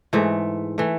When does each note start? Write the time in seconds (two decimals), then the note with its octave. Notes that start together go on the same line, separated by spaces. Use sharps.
0.13 G#2 E3 A3
0.78 E3 A3